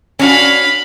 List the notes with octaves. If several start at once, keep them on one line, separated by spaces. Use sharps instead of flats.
C#4 D4 F#4 F5 B5